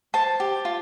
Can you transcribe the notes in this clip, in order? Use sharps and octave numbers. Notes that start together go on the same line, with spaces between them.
C5 A5
G4
F4